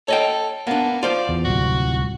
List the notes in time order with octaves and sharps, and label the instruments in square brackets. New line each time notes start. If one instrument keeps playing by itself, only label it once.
[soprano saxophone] A4 [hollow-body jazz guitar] C#5 D#5 G5
[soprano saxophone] A#3 [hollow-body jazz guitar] B3 D4
[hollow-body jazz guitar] F4 C5 F5 [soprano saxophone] D5
[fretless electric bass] E2
[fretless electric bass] D1 C2 [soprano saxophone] F#4